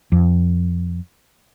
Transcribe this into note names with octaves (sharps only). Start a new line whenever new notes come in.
F2